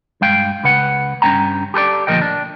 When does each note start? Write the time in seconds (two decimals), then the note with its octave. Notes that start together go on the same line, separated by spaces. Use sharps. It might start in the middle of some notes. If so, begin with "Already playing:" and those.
0.21 G2 G#3 F5 G5
0.64 C#2 C#3 B4 F#5
1.22 G2 F#3 C#4 G5 A#5
1.74 G4 A4 B4 D5
2.07 D2 A#2 F3 A#4 D#5 G5
2.22 D4